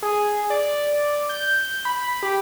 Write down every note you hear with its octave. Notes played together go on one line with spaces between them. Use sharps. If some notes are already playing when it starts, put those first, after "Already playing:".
G#4
D5
G6
B5
G4